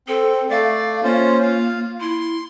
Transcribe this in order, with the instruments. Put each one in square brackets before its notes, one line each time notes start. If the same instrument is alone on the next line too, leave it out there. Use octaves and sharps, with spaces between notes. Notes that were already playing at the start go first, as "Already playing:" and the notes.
[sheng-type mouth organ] C4 [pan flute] A4
[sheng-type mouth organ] A3 D5 [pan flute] F5
[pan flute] A#3 [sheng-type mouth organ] C#4 F4 C5
[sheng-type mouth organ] F4 F5
[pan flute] E4 [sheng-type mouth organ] C6